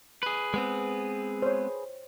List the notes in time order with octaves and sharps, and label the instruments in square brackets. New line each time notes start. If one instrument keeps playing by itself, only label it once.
[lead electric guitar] G#4 B4
[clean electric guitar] G#3 B3 C4
[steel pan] C5 C#5